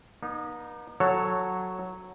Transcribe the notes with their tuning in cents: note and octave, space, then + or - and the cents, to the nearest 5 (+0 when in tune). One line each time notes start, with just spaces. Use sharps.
B3 -45 D#4 -15
F#3 +0 A4 +0 C#5 -5